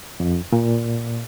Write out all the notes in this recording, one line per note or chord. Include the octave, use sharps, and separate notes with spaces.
F2
A#2